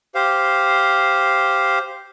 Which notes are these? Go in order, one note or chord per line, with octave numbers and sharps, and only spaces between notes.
G4 C5 F5